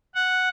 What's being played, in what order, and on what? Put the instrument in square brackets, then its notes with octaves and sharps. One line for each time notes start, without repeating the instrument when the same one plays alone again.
[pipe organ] F#5